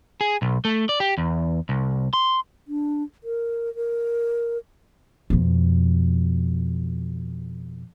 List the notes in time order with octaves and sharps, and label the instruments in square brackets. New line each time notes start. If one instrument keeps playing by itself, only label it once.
[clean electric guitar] G#4
B1
A3
D5
G4
E2
C2
C6
[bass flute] D4
A#4
A#4
[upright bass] F2 B2